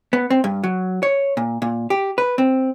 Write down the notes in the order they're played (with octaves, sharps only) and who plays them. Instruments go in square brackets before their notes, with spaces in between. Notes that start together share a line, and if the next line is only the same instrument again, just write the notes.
[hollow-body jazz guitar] B3
C4
G2
F#3
C#5
A#2
A#2
G4
B4
C4